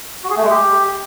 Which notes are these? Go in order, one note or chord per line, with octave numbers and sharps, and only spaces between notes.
F#4
G#4
A3
G#3
G4